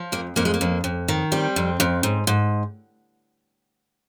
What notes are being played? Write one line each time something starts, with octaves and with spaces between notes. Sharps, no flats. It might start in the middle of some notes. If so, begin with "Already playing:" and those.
Already playing: F3
F2 A#3
F2 A#3
G#3
A#3
F2
F2
D#3
G3 C4
F2
F2
G#2
G#2